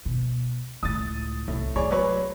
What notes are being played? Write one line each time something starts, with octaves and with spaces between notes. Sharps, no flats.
B2
C#2 A2 D#6 A6
C2 A2
G#3 A3 G#4 C#5 D5
F#3 B4 C#5